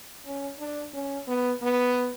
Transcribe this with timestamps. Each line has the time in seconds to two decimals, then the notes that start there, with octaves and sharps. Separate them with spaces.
0.26 C#4
0.59 D4
0.93 C#4
1.28 B3
1.62 B3